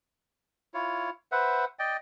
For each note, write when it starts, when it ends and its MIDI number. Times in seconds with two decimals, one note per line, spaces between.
0.74 1.10 64
0.74 1.10 65
0.74 1.10 73
1.32 1.65 71
1.32 1.65 72
1.32 1.65 76
1.32 1.65 78
1.79 1.97 74
1.79 1.97 75
1.79 1.97 79